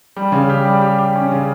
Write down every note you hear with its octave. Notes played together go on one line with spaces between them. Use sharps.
G3
C#3
G4
G3
G4
G4
C#4
C#3